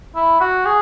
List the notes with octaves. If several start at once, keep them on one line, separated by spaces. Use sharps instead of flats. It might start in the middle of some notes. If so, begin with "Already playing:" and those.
E4
F#4
G#4